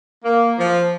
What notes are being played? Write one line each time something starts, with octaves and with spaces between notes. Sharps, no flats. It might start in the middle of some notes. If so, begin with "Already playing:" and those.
A#3
F3